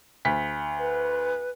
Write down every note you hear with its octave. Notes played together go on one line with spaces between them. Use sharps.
D2 B6
B4